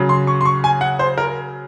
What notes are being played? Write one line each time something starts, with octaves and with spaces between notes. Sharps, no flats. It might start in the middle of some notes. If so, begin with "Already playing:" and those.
Already playing: C#3 F#3
C6
C#6
C6
C#6
G#5
F#5
C5
A#4